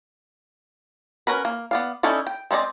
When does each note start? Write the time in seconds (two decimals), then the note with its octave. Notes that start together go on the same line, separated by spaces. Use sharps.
1.27 C#4 F#4 A#4 B4
1.45 A#3
1.71 B3 D5 F5
2.03 C#4 D#4 E4 A4 D5
2.27 G5
2.51 G#3 C4 D4 D5 D#5